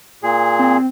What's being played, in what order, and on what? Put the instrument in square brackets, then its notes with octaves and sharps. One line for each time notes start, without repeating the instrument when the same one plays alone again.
[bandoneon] A#2 G#4
[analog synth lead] C4